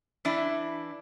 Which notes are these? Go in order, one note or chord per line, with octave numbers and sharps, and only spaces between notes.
E3 D4 E4